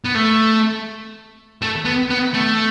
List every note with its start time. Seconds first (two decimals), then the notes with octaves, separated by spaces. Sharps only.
0.05 B3
0.15 A3
1.62 A3
1.85 B3
2.10 B3
2.34 A3